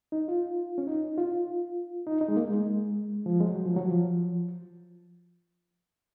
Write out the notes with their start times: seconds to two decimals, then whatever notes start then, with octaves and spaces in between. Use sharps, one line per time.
0.12 D#4
0.28 F4
0.78 C#4
0.87 D#4
1.18 F4
2.07 D#4
2.21 D#4
2.28 G#3
2.37 A#3
2.50 G#3
3.26 F3
3.41 G#3
3.46 F#3
3.66 F3
3.77 F#3
3.88 F3